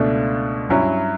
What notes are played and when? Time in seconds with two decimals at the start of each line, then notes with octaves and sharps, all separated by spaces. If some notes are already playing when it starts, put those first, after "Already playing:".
Already playing: C#2 B2 A3 D4
0.69 G2 F#3 C#4 E4